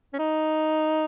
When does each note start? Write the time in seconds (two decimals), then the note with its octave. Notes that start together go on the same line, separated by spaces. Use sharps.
0.13 C#4
0.19 D#4